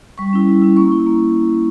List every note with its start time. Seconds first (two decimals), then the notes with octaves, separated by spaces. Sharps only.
0.18 G3 C#6
0.33 C#4 E4
0.47 G3
0.62 C#4 E4
0.76 A#3 C#6
0.92 E4
1.07 A#3